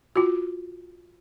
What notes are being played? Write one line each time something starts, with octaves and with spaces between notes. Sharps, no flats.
F4 F#4